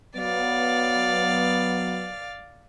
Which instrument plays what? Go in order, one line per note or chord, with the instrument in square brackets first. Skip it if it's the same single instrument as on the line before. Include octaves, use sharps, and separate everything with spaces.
[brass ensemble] F#3 B3 [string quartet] D5 F5